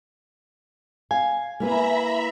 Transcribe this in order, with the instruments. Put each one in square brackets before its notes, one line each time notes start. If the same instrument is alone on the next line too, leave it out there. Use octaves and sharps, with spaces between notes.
[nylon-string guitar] F5 [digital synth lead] G#5
[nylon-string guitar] A#3 E4 B4 [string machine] E5 A#5 B5